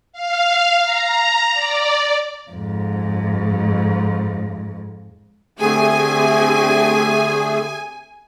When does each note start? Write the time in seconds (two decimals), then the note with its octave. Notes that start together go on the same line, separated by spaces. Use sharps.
0.13 F5
0.81 A#5
1.53 D5
2.51 F2 G#2
5.60 D3 A3 C4 G4 G#4 G#5